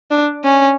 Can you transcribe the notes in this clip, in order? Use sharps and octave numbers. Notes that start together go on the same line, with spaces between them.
D4
C#4